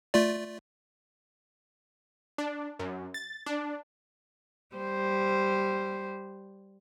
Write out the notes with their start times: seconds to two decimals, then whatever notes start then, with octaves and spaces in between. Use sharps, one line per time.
0.14 A3 F4 D5
2.38 D4
2.79 F#2
3.14 A6
3.46 D4
4.76 G3 C5